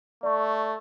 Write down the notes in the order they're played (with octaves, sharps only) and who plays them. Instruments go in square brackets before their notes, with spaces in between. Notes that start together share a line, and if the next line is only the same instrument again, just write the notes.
[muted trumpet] A3 [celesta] D5 C#6